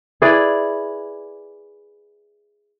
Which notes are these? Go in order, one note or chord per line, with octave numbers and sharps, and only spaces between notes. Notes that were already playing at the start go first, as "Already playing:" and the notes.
E4 G#4 B4 D5